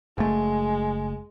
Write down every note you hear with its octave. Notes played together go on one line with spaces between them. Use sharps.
F#1 G#3 A3